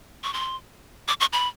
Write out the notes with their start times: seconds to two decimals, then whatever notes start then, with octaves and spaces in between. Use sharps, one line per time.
0.24 C#6
0.34 C6
1.08 D6
1.20 C#6
1.33 B5